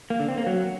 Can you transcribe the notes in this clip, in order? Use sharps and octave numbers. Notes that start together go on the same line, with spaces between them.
A#3
D3
C4
A#3
F#3